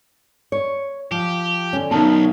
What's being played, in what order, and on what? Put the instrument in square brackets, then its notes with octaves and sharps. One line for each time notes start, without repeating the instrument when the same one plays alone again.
[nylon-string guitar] C#5
[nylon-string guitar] F3 [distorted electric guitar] G4
[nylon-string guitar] D3 C#4
[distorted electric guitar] B1 [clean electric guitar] B2 D#3 [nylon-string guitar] A5